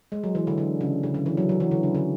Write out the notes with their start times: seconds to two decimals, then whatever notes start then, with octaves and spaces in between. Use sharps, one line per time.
0.12 G#3
0.24 F#3
0.35 E3
0.47 D3
0.58 D3
0.81 C#3
1.03 C#3
1.14 D3
1.26 E3
1.37 F#3
1.49 F#3
1.60 E3
1.71 D3
1.83 C#3
1.95 D3